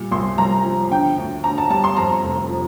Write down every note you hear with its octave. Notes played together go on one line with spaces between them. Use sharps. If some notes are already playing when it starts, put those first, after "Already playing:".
Already playing: A#2 G3
C2 C6
C2 A#5
F3
D3 G5
D2
D2 A#5
A5
G3 A5
C6
F2 A#5
F1
F3